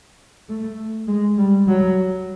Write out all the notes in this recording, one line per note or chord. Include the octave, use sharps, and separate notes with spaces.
A3
G#3
G3
F#3